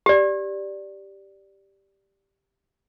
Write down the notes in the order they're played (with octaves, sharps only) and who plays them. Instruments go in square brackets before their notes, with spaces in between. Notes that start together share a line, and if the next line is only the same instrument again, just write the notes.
[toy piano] G4 D5